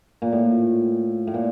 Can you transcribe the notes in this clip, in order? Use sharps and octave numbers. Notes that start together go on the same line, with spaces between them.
A#2
A2
A2
A#2